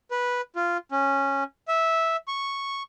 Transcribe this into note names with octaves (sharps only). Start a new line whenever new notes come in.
B4
F4
C#4
E5
C#6